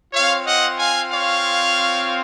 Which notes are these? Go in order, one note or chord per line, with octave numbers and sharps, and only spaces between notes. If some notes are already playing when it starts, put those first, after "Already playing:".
C4 F4 C#5 F5
D#5 F#5
F5 G#5
C#5 F5